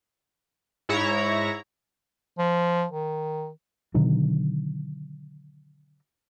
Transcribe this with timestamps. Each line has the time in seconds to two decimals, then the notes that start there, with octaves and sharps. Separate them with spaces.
0.89 G#2 E4 C#5 A#5
2.38 F3
2.92 D#3
3.94 B2 D3 D#3 F#3